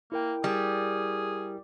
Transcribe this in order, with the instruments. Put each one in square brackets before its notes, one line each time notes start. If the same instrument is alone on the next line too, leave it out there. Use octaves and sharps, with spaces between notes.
[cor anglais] A#3 [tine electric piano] E4 A#4 G5
[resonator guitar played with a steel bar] G3 [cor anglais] G#4